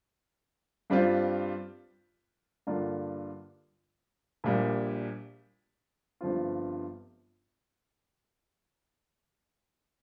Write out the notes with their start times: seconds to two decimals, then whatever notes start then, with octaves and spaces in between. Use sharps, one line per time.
0.90 G2 G3 C4 F4
2.67 G2 D3 A#3 D4 F4
4.44 A#1 A#2 G3
6.21 G1 G2 F3 C4 F4